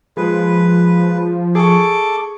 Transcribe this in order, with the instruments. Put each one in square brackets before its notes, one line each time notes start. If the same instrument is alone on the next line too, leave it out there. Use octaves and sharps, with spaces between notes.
[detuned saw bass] F3 [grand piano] G#3 [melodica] B4
[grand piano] G#4 C#6 [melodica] A4 D6